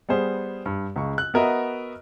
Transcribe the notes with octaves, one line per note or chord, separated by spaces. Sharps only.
G3 B3 G#4 C5
G2
C#2 C#3 C#6
F#6
B3 F#4 A#4 B4 D#5 E5